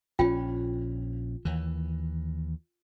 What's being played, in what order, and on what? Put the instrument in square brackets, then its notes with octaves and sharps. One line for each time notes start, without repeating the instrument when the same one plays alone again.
[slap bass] A#1 D#3 C#4 [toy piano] F4 G5
[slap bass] D#2 E3